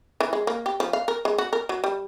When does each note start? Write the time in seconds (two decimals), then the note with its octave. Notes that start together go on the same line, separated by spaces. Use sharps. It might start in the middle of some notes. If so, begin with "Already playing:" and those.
0.20 E3
0.33 G#3
0.47 A#3
0.66 G4
0.80 F3
0.93 F5
1.08 A#4
1.25 G#3
1.38 F#4
1.53 A#4
1.69 F#3
1.84 G3